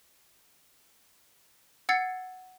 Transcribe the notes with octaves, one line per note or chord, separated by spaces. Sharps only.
F#5 E6 G#6 A6 C7 C#7